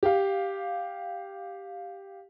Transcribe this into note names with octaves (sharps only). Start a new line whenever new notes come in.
G4 F5